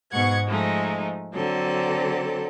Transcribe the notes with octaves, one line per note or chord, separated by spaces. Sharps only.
G#2 B2 F#5 C#6 G#6
F3 G#3 A3 D#4
D3 F#3 C4 A4